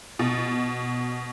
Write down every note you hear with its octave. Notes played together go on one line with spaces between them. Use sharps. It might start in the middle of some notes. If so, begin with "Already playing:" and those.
B2